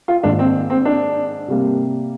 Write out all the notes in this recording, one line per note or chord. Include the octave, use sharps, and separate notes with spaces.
F4
G#2 D#3 A#3 D4
C4
C4
D4
C3 G3 A#3